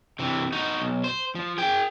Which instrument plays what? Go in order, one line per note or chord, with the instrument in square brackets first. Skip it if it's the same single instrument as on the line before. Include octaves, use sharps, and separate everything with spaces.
[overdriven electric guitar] C3 E3
D#4 F#4
B1
C5
F3
G#4 G5